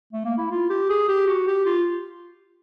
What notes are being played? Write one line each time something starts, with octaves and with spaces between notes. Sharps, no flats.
A3
A#3
E4
F4
G4
G#4
G4
F#4
G4
F4